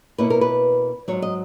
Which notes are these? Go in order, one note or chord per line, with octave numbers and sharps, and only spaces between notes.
B2 A#3 C#4 E4 B4
A#4
B4
G#2 D#3 F#3 C#5
D#5